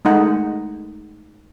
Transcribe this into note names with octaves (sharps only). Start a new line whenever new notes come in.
G#3 A3 D#4 F#5